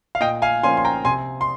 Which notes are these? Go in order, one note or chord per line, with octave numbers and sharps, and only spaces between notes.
F5
A#2 D#5 G5
F5 G#5
F3 A#3 C#4 G#5 C6
C6
G5 A#5
C3 G#5 C6
C6